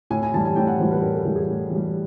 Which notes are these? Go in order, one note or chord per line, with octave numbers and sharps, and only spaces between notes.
A2 G#5
G#5
E3 G3 A5
G#5
A2 G5
F#5
E3 G3 C5
B4
A2 A#4
A4
E3 G3 G#4
G#4
A2 G4
E3
G3